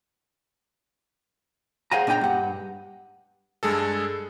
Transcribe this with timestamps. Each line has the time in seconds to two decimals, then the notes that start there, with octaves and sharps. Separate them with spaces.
1.91 G#4 C5 F5 F#5 G#5 A#5
2.07 A#2 D4 D#5 G5 A#5
2.21 G2 F#5
3.63 G2 G#3 G#4 A4